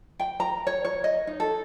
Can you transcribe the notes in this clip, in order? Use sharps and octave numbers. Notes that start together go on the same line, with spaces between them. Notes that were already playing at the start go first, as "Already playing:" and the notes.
G5
A#5
C#5
C#5
D#5
D#4
A4